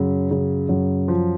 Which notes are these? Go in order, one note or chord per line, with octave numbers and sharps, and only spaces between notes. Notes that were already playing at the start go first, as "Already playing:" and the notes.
Already playing: F#2 C#3
C#3
F#2
F3